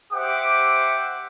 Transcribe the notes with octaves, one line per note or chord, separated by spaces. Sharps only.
G4 C5 E5 F#5 D6